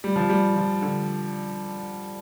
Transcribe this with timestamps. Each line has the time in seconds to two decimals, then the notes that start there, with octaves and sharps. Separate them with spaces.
0.04 G3
0.16 F3
0.29 G3
0.56 F3
0.82 D3